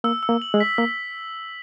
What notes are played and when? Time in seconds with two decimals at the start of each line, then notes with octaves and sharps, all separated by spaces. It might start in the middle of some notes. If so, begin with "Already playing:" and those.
0.04 A#3 E6
0.23 E6
0.29 A#3
0.42 F#7
0.54 G#3
0.60 B6
0.78 A#3 E6